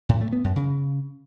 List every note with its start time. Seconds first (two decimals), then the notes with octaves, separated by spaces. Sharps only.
0.09 A2
0.21 A3
0.33 B3
0.44 F#2
0.56 C#3